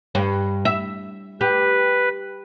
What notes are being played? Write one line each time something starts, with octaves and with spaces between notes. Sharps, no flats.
G2
E5
G4 B4